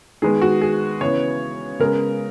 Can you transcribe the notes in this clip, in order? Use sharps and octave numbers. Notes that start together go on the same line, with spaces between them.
D#3 G#3 B3 G#4
F#4
G#4
C#3 E3 B3 C#5
C#3 G#3 B3 A#4